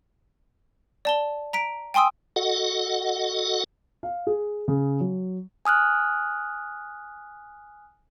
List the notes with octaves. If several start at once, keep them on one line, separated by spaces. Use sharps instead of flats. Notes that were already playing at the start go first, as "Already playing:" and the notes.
D5 A5 G7
A#5 B6 D7
G5 G#5 C6 D#6 E6
F#4 A4 D#5 F#5
F5
G#4
C#3
F#3
G#5 D#6 F6 F#6